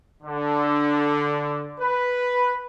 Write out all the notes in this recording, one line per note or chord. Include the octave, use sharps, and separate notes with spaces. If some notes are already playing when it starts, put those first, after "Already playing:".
D3
B4